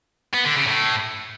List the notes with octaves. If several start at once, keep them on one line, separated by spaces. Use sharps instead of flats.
B3
D3
C#3
A2